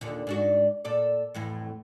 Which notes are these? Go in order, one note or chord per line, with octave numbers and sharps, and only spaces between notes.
D#2 A#2 D3
G#2 D4 F#4
A#2 A4 D5
F2 A2 E3